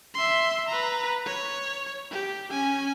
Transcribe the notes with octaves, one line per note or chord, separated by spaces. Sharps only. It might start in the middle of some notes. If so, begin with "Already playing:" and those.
E5 C6
B4 A#5
C#5
G4
C#4 G#5